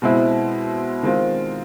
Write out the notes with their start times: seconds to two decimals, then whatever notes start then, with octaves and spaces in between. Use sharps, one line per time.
0.02 B2 G#3 C4 E4
1.03 D#3 G#3 C4 F4